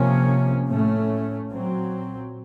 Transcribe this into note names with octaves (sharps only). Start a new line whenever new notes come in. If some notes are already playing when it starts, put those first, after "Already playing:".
Already playing: C3 F3 A#3 C#4
A2 A3 C#4
A#2 F#3 C4